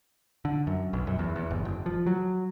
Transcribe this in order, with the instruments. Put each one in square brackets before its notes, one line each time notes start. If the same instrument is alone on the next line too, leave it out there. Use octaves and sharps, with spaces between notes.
[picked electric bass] D3
F#2
B1
F#2
E2
E2
G1
F#1
F3
F#3